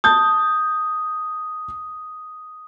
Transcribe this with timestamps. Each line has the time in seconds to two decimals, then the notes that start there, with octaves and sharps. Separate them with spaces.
0.04 A5 D#6 G6